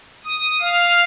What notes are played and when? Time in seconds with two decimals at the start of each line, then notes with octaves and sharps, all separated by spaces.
0.24 D#6
0.61 F5